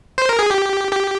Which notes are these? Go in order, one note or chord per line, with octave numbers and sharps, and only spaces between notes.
C5
A#4
G#4
G4
G4